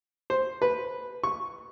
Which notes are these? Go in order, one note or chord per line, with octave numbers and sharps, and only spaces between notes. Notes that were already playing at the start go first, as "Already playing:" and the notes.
C5
B4
C#6